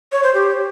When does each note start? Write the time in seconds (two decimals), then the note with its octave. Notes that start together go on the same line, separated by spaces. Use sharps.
0.12 C#5
0.23 C5
0.34 G4